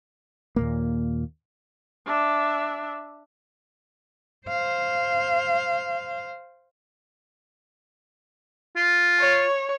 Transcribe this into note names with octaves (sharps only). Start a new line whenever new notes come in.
D#2 A#2 A#3
D4 E5
C5 F5
F4
C#5